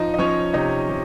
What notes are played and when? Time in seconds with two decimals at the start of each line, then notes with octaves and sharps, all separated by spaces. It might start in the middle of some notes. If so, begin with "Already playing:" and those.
Already playing: F3 D#4 D#5
0.14 D#5
0.18 F3 C#4 C#5
0.54 C3 D#4 D#5
0.89 C3